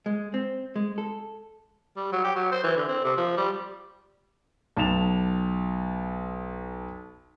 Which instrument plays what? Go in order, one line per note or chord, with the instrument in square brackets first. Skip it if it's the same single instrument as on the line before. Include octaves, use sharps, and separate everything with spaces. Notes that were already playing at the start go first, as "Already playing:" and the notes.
[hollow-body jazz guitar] G#3
C4
G#3
A4
[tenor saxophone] G3
F#3
G4
F#3
C5
E3
D3
C4
C3
F3
G3
[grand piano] B1 A5 E7 F7